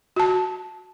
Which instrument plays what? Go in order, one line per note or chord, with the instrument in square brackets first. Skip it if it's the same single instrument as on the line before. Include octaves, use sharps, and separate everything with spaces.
[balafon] F#4 A5